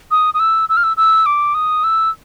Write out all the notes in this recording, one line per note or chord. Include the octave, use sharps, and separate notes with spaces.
D#6
D#6
E6
E6
F6
E6
E6
D6
D#6
E6